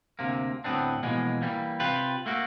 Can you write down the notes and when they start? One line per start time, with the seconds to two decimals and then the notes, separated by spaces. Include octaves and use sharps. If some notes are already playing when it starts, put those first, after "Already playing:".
0.19 D2 C3 A#3
0.64 D2 A2 D3 B3 C4 D4
1.03 B2 E3 F3 G#3 A#3
1.42 E3 G3 A#3
1.80 C3 F4 G4 B4
2.26 A3 A#3 F#4